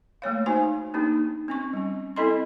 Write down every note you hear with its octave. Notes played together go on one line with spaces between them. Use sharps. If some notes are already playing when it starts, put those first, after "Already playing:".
A3 A#3 C#5 F5
D#4 F#4 C5 F5 G#5
A#3 D4 D#4 G4
C4 C#4 C#6
G3 C#4
C4 E4 A4 D#5 B5 C6